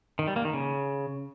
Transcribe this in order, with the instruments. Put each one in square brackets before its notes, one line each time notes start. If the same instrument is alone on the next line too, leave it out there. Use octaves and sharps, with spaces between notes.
[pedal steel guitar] D#3
G3
A#3
D#3
C#3